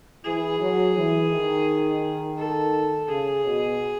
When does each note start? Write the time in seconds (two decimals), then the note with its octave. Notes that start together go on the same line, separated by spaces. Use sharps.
0.24 E3 G#4
0.60 F#3
0.96 E3
1.31 D#3
2.38 A4
3.09 C#3 G#4
3.45 B2